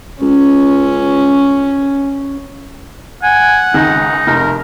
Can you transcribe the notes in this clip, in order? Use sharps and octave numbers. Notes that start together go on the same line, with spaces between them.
C#2 C#4
F#5 G#5
C#2 D#3 D#4
F1 A#4